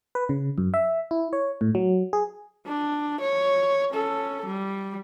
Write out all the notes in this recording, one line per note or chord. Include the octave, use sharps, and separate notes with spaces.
B4
C#3
F#2
E5
E4
C#5
A2
F#3
G#4
D4
C#5
C#4 A4
G3